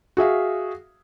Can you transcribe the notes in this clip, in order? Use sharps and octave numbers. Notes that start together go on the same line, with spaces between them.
F#4 G#4 E5 F5